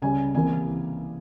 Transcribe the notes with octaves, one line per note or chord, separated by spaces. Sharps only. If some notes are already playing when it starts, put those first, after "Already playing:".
C#2 C#3 G3 C#4 G#5
C2 C3 E3 A#3 G#5